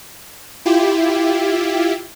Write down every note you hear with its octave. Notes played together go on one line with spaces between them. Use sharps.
E4 F4 G4